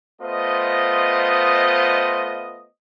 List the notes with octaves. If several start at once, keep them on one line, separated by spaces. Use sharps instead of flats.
A3 B3 F4 C5 D#5